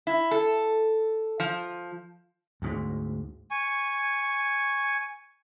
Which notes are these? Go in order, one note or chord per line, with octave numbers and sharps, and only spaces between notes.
E4
A4
F3
D2 G#2
G#5 C#6